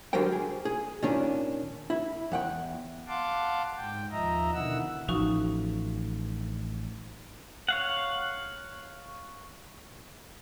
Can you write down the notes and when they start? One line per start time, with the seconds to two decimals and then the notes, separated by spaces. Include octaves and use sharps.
0.13 D3 F#3 G3 A#4 C5 G5
0.32 G#4
0.65 G#4
1.03 A#2 D#3 C#4 D4
1.90 E4
2.32 E2 F#5 G5
3.08 F5 F#5 A5 C6 D6
3.77 G#2 G5
4.11 D#2 F3 D#5 E5 A#5
4.54 B2 D3 D#3 E4 F#5 E6
5.09 A1 F3 D#4 F#4 C#6
7.69 C#5 F5 F#5